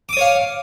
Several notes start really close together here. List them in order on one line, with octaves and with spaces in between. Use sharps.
D6 D#6 C#5 F5